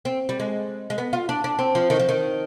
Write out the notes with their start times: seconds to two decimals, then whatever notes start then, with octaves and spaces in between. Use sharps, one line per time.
0.05 C4
0.29 G3
0.40 G#3
0.90 G#3
0.98 B3
1.13 F4
1.29 D4
1.44 D4
1.59 C4
1.75 F3
1.90 D#3
1.99 F3
2.09 D#3